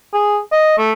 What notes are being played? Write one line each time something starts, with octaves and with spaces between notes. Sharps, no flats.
G#4
D#5
A3